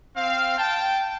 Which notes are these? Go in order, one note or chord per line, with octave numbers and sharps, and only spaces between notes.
C4 F5
G5 A5